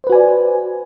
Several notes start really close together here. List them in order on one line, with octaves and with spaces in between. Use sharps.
C5 B4 F#4 G#5 D5